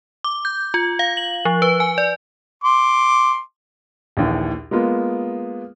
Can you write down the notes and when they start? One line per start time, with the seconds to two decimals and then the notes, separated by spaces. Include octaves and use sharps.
0.24 D6
0.45 G6
0.74 F4
0.99 F5
1.17 F#7
1.45 F3
1.62 B4
1.80 G#5
1.98 D5
2.64 C6 D6
4.17 A#1 D#2 E3
4.71 G#3 A#3 B3 F4